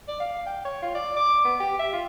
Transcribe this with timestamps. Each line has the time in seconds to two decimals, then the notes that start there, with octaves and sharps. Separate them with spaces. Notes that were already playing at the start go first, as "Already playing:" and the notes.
0.08 D5
0.20 F5
0.47 G5
0.65 C#5
0.82 F4
0.95 D5
1.17 D6
1.45 B3
1.60 G4
1.80 E5
1.93 F4